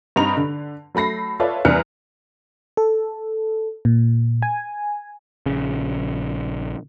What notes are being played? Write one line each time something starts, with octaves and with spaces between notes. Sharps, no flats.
G2 C4 D#4 A#5 F7
D3
F#3 A3 B5 A#6 C7
F4 A4 B4 C#5 D5 E5
E2 G3 A#4 F6 F#6 C#7
A4
A#2
G#5
A#1 C#3